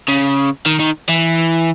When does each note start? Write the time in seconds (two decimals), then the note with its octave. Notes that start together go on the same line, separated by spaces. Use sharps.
0.08 C#3
0.66 D#3
0.80 D#3
1.09 E3